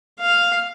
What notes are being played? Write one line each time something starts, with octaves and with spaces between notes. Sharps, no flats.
F5